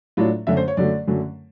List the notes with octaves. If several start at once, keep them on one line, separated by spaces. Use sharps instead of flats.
A2 F#3 A3 D4 F4
F#2 D3 F#3 A3 E5
C5
C#5
F#2 D3 F#3 A3 D5
F#2 D3 F#3 A3